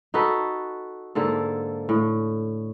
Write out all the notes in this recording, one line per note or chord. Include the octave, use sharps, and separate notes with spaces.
D#4 F#4 A4 B4
G#2 D3 A#3 A4
A2